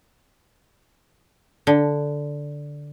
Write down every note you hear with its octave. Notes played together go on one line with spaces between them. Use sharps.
D3